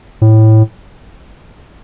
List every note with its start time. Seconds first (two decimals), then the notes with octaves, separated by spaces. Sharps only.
0.22 A2